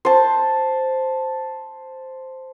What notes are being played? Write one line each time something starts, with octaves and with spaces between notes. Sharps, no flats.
C5 A5